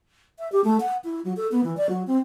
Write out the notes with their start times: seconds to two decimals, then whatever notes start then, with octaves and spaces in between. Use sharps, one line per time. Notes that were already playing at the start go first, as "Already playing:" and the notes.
0.39 E5
0.52 G4
0.64 A3
0.80 F#5
1.04 E4
1.25 F#3
1.37 A4
1.52 B3
1.64 E3
1.77 D5
1.89 F#3
2.07 C4